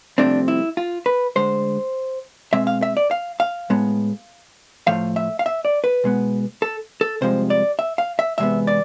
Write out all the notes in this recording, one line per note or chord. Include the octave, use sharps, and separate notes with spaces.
C2 C3 F3 A3 C4 D4
E4
F4
B4
D2 D3 G#3 C5
B2 G#3 C4 E5
F5
E5
D5
F5
F5
A2 G#3 B3
A2 F3 A3 F5
E5
F5
E5
D5
B4
B2 G#3 B3
A4
A4
C2 C3 F3 G#3 C5
D5
E5
F5
E5
E2 C3 G#3 B3 E5
D5